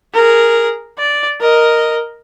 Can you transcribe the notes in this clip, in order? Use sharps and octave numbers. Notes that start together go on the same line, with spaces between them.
G#4 A#4
D5
A#4 D#5